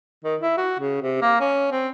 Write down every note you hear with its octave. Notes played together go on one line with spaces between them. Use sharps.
D#3
E4
F#4
C#3
C3
A#3
C#4
C4